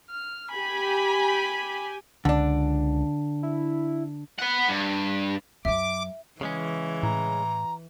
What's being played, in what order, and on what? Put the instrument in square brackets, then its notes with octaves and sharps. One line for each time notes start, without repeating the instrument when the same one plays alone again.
[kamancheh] F6
[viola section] G4 G#5 [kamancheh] B5
[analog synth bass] C#2 [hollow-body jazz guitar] D3 D4
[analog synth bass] E4
[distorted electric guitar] B4 F#5
G2
[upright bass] F#2 F#3 [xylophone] E5 [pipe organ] D6
[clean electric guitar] C#3 G#3 C#4 [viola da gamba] E3
[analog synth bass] A2 [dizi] A#5